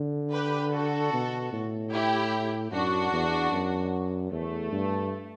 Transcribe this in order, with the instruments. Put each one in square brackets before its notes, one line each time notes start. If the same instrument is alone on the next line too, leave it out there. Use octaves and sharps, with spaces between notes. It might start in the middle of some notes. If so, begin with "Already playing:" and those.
Already playing: [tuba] D3
[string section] G4 B4
F#4 A4
[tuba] B2
A2
[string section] E4 G4
[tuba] F#2 [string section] D4 F#4
[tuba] E2
F#2
[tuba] E2 [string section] A3
[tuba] G2